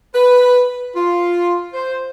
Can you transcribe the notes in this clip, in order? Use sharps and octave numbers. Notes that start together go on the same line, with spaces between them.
B4
F4
C5